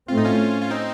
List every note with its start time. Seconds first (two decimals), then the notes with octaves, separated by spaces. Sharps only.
0.08 A2 A3 C4 F4
0.18 D#4
0.25 C#4 F4
0.61 F4
0.70 C4 D#4